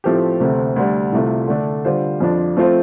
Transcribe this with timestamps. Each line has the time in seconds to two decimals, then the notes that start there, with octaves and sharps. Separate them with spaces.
0.04 A2 F3 A3 C4 G4
0.40 D2 C3 A3 C4
0.76 D2 D3 G3
1.12 C2 C3 A3 F4
1.48 D3 A3 D4
1.85 D3 G3 F4 C5
2.20 F2 F3 D4
2.57 F3 A3 C4 F4 C5